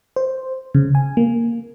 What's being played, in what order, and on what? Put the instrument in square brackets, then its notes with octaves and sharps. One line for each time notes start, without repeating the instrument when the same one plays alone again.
[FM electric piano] C5
C#3
G#5
A#3